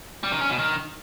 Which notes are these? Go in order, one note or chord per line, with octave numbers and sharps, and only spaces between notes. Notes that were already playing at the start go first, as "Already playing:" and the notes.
G3
D#3
C#4
B2
D#3